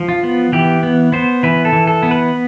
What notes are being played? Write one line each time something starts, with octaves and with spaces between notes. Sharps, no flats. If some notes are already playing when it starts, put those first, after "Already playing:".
Already playing: F3
F4
B3
E3 G4
B3
B3 C5
E3 B4
A4
E3
A4
B3
B4